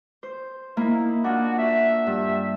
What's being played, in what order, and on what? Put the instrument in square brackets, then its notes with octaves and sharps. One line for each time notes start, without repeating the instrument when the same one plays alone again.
[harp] C5
[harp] A#3 D#4 [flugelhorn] E4
[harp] D4 F4 [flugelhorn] F#4
[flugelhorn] E5
[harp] G2